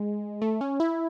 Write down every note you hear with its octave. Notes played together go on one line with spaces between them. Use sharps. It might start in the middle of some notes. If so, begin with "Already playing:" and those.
Already playing: G#3
A3
C#4
E4